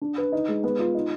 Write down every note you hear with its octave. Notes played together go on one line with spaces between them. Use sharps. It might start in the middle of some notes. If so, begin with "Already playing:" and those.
D4
B4
D#4
G#3
B3
F4
D#4